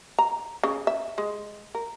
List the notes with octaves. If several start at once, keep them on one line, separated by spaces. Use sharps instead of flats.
A#5
C#3
E5
G#3
A#4